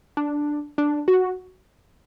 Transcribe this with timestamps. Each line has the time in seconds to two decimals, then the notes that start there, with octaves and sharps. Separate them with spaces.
0.17 D4
0.78 D4
1.08 F#4